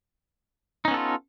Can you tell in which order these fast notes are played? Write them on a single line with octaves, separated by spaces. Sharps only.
D#4 C#4 B3 A4 F4